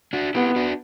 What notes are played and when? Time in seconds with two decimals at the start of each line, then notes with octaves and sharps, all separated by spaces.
0.13 D4 F#4
0.35 B3 E4 G4
0.56 D4 F#4